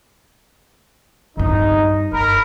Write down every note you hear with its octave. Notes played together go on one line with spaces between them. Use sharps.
G2 C3 D#4
F#1 A#4 B5